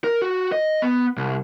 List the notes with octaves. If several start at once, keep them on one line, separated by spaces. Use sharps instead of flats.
A#4
F#4
D#5
B3
C2